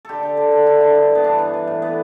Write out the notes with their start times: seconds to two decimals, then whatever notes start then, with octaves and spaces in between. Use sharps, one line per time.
0.05 D3 G4 A4
0.23 D3
0.37 D3
0.52 D3
0.66 D3 E4
0.81 D3
0.95 G2
1.11 G2 B3
1.24 E3 D4
1.39 E3
1.54 E3
1.67 A2
1.82 B3